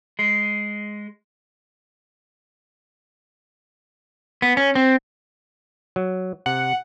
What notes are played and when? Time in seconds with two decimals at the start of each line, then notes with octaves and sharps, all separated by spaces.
0.19 G#3
4.42 B3
4.57 C#4
4.75 C4
5.96 F#3
6.46 C3 F#5